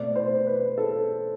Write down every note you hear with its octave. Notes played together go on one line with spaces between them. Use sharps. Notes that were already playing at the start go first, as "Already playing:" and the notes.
Already playing: B2 A3 C4 D5
C5
B4
A4